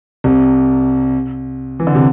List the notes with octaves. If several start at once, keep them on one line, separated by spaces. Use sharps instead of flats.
C2 C3
E3
D3
C3